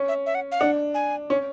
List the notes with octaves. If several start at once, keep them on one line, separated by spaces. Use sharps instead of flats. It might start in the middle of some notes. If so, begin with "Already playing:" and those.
Already playing: C#4
E5
E5
F#5
F5
D4 F#5
G#5
C#4